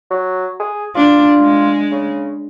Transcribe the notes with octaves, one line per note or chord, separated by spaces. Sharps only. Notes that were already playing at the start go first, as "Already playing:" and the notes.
F#3
G#4
D4 F4
G#3
C#3